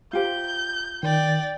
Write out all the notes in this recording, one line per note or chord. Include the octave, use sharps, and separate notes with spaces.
F4 G4 C5 G6
D#3 D5 G5